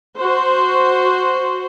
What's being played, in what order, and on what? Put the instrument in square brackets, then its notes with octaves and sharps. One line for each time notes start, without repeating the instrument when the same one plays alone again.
[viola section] F#4 C5